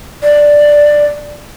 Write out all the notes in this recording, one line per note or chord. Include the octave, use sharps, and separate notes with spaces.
D5